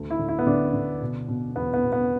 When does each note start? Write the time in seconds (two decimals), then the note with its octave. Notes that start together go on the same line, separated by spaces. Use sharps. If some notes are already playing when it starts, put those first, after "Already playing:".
Already playing: D2
0.10 E4
0.19 D3
0.29 E4
0.39 B3
0.47 D3 D4
0.74 D3
1.01 B2
1.28 B2
1.56 E2 B3
1.74 B3
1.83 B2
1.92 B3